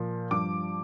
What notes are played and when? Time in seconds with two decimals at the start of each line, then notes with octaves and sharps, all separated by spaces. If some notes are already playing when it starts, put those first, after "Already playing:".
Already playing: A#2 F3
0.31 G2 F3 D6